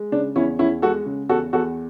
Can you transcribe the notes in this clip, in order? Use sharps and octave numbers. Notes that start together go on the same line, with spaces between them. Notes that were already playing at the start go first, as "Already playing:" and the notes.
Already playing: G#3
C#3 D4
E2 C#4 E4
E2 C#4 E4
G#3 F#4 A4
C#3
E2 F#4 A4
E2 F#4 A4